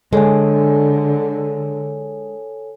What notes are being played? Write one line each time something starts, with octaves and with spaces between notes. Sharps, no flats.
D3 G#3 A4 C#5 G#5